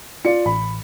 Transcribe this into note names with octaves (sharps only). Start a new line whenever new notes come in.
F4 D5 C#7
A1 B5